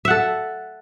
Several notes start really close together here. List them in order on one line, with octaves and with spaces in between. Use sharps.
E5 F#5 A4